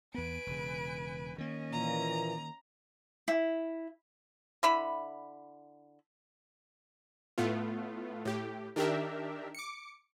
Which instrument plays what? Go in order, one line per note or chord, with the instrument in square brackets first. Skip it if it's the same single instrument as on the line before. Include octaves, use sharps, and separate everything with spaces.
[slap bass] E2 B3 [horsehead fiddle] B4 G#5 [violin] D7
[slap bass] E1 C#3
[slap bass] D#3 A#3 [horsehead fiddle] C#4 D#5
[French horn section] A#2 E3 [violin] A#5
[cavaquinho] E4
[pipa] D3 E4 B5
[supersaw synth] A2 A3 B3 F4
A2 G4
D#3 D4 G4 A#4 E5
D6 C#7